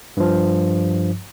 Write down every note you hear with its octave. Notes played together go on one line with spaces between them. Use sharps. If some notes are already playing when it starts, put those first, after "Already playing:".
G2 F3